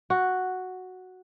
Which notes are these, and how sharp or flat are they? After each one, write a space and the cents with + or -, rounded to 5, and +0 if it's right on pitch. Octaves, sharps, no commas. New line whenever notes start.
F#4 +0